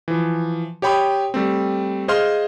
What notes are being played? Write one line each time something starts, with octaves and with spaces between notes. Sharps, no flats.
E3 F3
G4 C#5 G5 B5 C6 D#6
G3 A3 C4
G#4 C5 D#5 F5 C6 F6